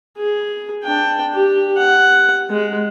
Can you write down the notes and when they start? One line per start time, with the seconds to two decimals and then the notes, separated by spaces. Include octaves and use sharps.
0.18 G#4
0.84 D4 G5
1.34 G4
1.77 F#5
2.50 G#3